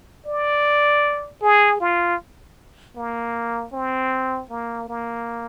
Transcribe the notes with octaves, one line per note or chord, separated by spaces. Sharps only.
D5
G#4
F4
A#3
C4
A#3
A#3